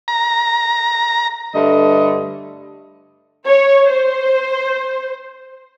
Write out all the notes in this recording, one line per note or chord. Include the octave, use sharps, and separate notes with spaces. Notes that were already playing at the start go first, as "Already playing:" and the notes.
A#5
G2 D3 A3 D#5
C#5
C5